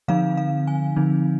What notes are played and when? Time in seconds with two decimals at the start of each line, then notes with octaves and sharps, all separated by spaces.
0.08 D3 F3 C4 D#4 F5
0.37 F5
0.67 G#5
0.96 D3 F3 C4 D#4